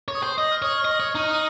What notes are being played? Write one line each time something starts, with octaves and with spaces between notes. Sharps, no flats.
C#5
D#6
C5
D#5 D#6
F6
C#5 D#6
F6
D#5
D#6
C#5
D#4 F6
D#6